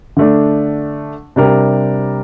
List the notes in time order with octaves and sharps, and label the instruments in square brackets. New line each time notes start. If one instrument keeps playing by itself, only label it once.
[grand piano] D3 A3 D4
C3 G3 D4 G4 A#4